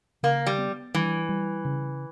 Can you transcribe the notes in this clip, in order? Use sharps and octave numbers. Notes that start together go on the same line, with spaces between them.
C#3 A#3
G3
B3
E3 G3
G3
C#3